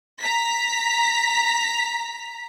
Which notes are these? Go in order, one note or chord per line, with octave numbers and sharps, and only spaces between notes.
A#5 B6